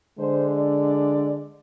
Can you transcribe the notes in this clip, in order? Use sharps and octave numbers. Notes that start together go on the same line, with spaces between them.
D3 G#3 D4 C5
D5